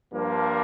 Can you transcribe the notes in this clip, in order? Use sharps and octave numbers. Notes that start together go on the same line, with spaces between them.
G2 F3 A#3